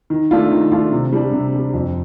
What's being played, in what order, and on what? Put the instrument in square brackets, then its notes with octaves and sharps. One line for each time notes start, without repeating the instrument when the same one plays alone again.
[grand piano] D#3
A3 D4 F4
D#3
A3 D4 F4
C3
G3 D4
C3
G3 D4
F2